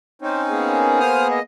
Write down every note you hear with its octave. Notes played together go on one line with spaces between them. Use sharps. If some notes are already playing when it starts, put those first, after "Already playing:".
C4 C#4 D#4 C5
A#3 B3 G#4
C5 D#6 F6
D#5